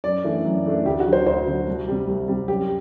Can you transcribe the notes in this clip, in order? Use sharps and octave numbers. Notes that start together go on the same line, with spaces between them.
F#2 D5
E3 A3 D4
F#2
E3 A3 D4
D2 G4
F#4
D3 F#3
C5
D2 C5
D3 F#3
C2
C3 G3
C2
C3 G3
F#2 G4